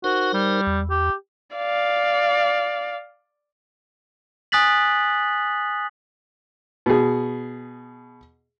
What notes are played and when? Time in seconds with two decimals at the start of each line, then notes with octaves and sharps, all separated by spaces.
0.04 D#4 F#4 A#4 C5
0.34 G3
0.67 E2
0.90 G4
1.57 D5 F5
4.52 G#5 D#6 F#6 A6 B6 F#7
6.86 B2 G#4